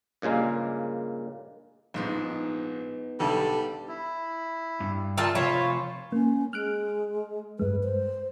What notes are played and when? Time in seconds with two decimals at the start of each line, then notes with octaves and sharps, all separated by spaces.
0.22 G2 A#2 C#3 G#3 A#3
1.94 A#1 G#2 G#3 B3 D#4
3.20 B1 D3 D#3 G3 A4
3.88 E4
4.80 G2
5.17 D#3 F4 A#4 D5 A5 E6
5.35 C3 F3 F4 C5 C#5 B5
6.12 A#3 C#4
6.53 G#3 F6 F#6 D7
7.59 G2 G#3 B4
7.84 C5